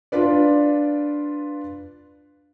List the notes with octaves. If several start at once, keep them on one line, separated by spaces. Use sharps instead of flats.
D4 F4 B4 D5